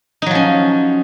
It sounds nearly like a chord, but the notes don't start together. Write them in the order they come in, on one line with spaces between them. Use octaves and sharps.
D#4 F#3 F3 C#4